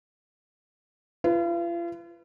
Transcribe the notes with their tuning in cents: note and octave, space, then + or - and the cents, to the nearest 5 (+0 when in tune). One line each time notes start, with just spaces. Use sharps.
F4 -40 B4 +0